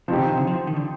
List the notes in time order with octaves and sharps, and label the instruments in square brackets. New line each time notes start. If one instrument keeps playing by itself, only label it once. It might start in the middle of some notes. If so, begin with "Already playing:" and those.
[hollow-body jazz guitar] C3 [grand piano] F3 C4 D#4 G4
[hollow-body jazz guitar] D#3
C3
D3
F3
D#3
D3